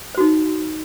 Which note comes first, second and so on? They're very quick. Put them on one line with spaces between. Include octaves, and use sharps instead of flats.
C5 F#4 D#4